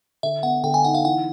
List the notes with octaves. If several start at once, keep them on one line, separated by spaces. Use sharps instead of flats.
D3 E5
B3 F#5
D3 G5
G#5
D#4 F#5
F5
E3 F#5